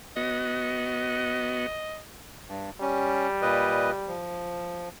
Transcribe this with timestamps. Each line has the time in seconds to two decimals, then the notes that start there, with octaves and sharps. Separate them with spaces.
0.16 B3 F#4 D#5
2.48 G2
2.81 G3 C#4
3.42 A#2 B4 D#5
4.07 F3